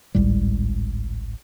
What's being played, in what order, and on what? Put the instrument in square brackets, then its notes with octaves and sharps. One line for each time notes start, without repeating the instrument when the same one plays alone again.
[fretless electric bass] G#1 C#2 A2 G3